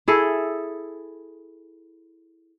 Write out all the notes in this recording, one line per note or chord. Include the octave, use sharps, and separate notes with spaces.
E4 G#4 A4